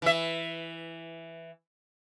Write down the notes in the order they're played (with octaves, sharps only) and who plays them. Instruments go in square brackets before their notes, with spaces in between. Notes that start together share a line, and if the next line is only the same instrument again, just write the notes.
[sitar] E3 E5